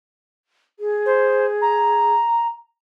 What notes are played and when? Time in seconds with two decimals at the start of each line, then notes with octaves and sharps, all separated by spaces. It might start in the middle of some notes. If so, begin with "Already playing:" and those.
0.80 G#4
1.06 C5
1.61 A#5